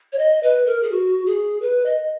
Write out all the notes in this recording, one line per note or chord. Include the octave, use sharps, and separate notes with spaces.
C#5
D#5
B4
A#4
G#4
F#4
G#4
B4
D#5